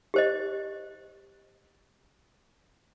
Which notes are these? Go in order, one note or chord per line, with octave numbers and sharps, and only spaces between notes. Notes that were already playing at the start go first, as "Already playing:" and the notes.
G4 C5 D#5